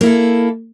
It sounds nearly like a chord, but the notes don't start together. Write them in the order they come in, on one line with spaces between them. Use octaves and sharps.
A#3 E4 A4